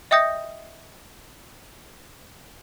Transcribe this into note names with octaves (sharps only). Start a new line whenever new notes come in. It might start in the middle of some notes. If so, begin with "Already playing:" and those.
D#5 E5 G5 D#6 G6 A#6